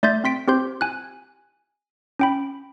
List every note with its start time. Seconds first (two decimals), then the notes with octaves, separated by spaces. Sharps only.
0.03 A3 D5 E5 C6 G6 A6
0.24 C4 C6 B6 D7
0.48 C4 G4 C5 C6 G6
0.81 G#5 F#6
2.19 C#4 G5 B5